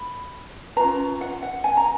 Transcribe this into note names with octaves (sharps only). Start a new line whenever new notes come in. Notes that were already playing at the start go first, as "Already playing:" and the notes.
Already playing: B5
C#4 F4 B4 A#5
F#5
F#5
G#5
A#5